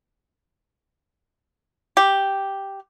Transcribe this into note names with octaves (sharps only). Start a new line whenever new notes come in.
G4